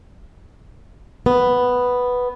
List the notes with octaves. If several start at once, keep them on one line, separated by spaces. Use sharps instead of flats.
B3